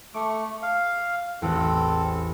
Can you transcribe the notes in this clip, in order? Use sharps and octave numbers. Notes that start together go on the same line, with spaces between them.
A3 C#6 D6
F5
A1 E2 C4 A4